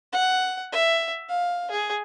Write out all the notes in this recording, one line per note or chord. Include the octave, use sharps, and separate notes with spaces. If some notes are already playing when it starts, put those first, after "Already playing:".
F#5
E5
F5
G#4